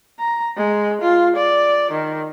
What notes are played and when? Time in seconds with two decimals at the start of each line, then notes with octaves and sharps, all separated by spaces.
0.19 A#5
0.57 G#3
1.02 F4
1.36 D5
1.92 D#3